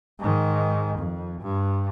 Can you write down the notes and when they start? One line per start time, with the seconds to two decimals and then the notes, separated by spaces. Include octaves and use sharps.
0.19 G#2 D#3
0.98 F2
1.41 G2